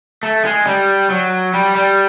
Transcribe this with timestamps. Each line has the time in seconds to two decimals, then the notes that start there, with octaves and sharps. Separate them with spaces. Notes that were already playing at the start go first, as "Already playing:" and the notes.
0.23 A3
0.45 G#3
0.67 G3
1.10 F#3
1.54 G3
1.75 G3